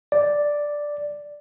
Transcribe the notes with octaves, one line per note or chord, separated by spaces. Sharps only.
D5